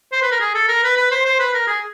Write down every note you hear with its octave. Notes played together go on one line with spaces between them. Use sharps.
C5
B4
A#4
G#4
A4
A#4
B4
B4
C5
C5
B4
A#4
G#4